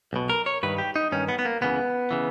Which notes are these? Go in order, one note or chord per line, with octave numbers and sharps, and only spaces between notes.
B1 B2
A#4
C#5
G2 D#3 B4
G4
D#4
G2 D#3 C#4
B3
B3
A#3
C#2 C#3 E3 B3
C#3 E3